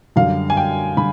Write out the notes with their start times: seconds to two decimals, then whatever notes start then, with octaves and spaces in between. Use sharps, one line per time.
0.16 F#2 D3 G3 F5
0.50 G#5
0.57 G5
0.97 D3 G3 B5